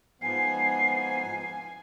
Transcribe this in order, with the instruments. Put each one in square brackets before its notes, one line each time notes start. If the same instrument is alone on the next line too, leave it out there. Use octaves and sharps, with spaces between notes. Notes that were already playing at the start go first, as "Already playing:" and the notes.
[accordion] G#2 F3 B3 [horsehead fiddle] G#5 [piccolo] C7